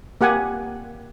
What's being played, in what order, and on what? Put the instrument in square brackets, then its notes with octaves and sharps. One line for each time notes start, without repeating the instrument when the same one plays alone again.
[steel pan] A#3 G4 F#5 G#5